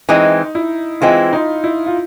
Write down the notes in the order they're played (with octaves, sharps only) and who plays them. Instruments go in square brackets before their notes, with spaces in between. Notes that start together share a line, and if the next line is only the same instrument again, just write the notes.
[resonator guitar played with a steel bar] E3 G#3 C4 [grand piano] D#4
[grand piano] E4
[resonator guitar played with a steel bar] E3 G#3 C4 [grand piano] F4
[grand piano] D#4
E4
F4